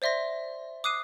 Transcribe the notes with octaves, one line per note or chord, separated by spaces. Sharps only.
C5 D5 E5 C6 A#6
D6 D#6 F#6 C7 D#7